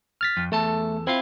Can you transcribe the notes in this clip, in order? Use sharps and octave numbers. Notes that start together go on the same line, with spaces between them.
F6 A6 B6
F2
E2 A3 A4 A5
C4 E4 F4 F5